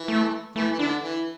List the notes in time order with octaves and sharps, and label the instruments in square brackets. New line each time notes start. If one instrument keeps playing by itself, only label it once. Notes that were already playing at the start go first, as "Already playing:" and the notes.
Already playing: [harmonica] E3
[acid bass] A3
[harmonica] E3 [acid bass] A3
[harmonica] E3
[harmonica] D3 [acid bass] D4
[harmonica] E3